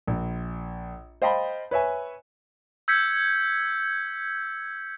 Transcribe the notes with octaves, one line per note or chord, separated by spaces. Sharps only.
A#1
C5 D#5 F5 G5 A5 B5
B4 C#5 E5 G#5
E6 G6 G#6 B6 C#7